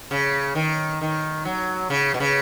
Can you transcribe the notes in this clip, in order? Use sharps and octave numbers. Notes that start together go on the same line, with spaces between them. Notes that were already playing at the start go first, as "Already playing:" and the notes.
C#3
D#3
D#3
F#3
C#3
B2
C#3